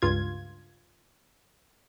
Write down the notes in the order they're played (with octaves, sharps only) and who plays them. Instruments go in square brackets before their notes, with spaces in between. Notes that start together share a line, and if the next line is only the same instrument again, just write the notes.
[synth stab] C#2 G2 F4 G#6